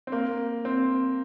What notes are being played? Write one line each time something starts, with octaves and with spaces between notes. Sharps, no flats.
C4
A#3
C4